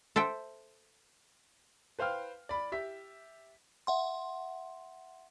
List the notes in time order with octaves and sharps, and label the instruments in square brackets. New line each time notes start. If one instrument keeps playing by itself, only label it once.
[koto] A4 C5 E5 G5
[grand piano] B4 C5 F5 G5 F6
D5 B5
G4 E5 B6
[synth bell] E5 F#5 C6